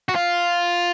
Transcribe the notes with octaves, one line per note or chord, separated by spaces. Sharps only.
F#4
F4